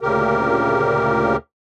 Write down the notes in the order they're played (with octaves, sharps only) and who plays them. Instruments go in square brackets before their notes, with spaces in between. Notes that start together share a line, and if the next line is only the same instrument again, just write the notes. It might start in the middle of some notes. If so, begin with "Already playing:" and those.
[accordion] D2 A#2 C#3 G4 A#4